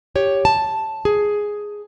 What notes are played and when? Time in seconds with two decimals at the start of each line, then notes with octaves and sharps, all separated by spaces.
0.15 G4 C#5
0.45 A5
1.05 G#4